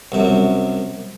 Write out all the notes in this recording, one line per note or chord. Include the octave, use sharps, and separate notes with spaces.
C2 F#2